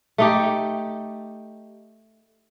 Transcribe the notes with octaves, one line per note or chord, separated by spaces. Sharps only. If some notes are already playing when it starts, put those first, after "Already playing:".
A3 D#4 G4